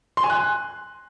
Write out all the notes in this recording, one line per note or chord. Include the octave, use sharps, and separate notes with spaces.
C6
G#5
F#6